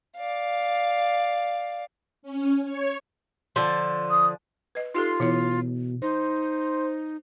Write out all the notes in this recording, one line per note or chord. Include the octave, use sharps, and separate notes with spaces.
D5 F5
C#4
C#5
D3 F3
D#6
B4 D#5
D#4 F4 G4 A4 C6
B2 E3 E4 C#5
D#4 C5